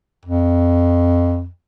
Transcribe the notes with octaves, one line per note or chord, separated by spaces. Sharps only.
F2